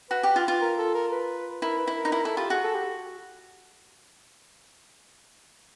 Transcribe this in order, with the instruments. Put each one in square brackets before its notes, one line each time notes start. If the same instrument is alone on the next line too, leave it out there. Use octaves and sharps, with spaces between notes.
[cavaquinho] F#4 [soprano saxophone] B4
[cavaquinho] G4
F4
F4
[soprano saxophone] A#4
A4
A#4
B4
[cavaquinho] E4 [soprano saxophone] A#4
[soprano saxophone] B4
[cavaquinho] E4
[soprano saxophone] A#4
[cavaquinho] D#4
[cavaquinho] E4 [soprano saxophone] A#4
[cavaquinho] E4 [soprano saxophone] A4
[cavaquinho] F4 [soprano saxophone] G4
[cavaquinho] F#4 [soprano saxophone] G#4
[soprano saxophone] A4
G4